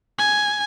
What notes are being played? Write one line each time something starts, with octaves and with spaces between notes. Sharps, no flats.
G#5